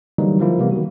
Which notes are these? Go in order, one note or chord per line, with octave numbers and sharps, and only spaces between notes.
D3 E3 F#3 G3 A#3 D#4
F3 A#3 E4 F4
C3 E3 G3 A#3 B3
D#3 F#3 F#4